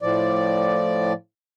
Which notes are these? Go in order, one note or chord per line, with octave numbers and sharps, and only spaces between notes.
A2 F3 D5